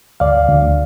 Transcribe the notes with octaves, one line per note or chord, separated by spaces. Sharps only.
D2 D5 F5
D2